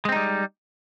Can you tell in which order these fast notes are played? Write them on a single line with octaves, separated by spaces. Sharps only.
G#3 C4 D#4 G3